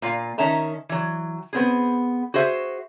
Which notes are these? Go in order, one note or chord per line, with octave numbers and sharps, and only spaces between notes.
A#2 F4 F5
D#3 C#4 E5 A5 A#5
E3 F#3
B3 C4 G#4
F#4 G#4 C5 E5